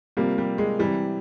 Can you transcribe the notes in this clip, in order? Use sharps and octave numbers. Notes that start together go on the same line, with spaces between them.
C3 F3 G3 A#3
G3
G#3
C3 E3 G3